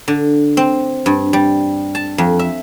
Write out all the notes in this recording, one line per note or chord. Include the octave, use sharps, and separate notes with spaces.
D3
C4
G2
G3
A5
F2
E5